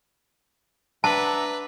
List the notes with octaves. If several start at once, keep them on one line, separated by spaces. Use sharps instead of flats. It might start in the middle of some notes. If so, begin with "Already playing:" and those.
D4 B4 E5 F#5 A5 A#5